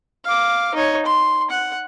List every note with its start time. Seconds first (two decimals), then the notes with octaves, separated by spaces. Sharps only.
0.25 F5 D6
0.75 D#4 C#5
1.06 C6
1.51 F#5